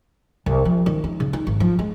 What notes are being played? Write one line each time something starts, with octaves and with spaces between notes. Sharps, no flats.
C2
F3
D#3
D#4
C#3
D#4
G#1
F3
G#3